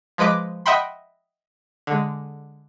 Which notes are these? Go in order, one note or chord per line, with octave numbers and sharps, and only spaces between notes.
F3 G#3 B4 D#5 D6
D#5 E5 F#5 G5 B5 C6
D3 G#3